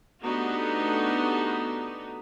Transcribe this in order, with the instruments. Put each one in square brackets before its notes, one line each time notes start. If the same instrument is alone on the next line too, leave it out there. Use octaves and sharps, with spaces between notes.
[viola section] A3 B3 D4 D#4 F#4 G4